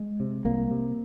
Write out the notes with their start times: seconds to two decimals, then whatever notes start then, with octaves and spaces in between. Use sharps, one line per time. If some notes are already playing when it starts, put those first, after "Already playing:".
Already playing: G#3
0.20 C3
0.45 C2 A#3
0.71 C3